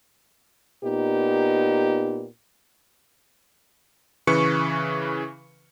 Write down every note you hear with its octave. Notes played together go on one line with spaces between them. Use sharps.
A#2 B3 D#4 G4
C#3 E3 B4 C#6 C#7